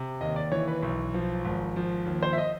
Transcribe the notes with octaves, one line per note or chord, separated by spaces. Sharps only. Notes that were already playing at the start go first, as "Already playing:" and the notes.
Already playing: C3
D#2 D#5
D5
E3 C#5
B4
B1
F3
G#1
F3
D#2
C5
E5
D#5